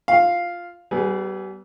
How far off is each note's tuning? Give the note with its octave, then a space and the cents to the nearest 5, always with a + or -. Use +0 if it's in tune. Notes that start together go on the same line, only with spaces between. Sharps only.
F4 +0 F5 +0
G3 -35 B3 +0 G#4 +15